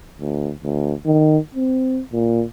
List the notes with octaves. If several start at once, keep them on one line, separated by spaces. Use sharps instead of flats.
D2
D2
D#3
C4
A#2